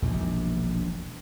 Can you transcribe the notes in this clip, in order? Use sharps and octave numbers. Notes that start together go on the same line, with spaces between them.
E1 A#1 D#2